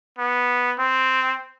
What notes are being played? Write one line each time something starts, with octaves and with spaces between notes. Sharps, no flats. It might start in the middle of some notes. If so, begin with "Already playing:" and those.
B3
C4